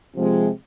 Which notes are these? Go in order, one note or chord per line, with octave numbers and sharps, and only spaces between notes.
C3 F3 G#3